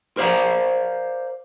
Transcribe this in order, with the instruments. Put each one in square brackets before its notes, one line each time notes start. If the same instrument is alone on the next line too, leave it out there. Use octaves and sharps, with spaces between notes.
[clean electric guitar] A#4 C5 D5 F5 A#5